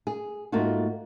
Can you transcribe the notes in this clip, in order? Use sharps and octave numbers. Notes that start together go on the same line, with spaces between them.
G#4
G#2 A3 A#3 F4 F#4